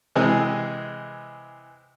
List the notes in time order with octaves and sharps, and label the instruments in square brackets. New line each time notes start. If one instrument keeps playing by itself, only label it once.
[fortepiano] C3 E3 G#3 G#4